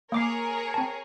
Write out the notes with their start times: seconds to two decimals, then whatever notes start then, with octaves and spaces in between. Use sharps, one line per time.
0.12 A#3 G#4 A#4 C#5 D6 C7
0.74 C4 A5